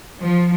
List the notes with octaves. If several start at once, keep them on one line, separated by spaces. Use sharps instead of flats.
F3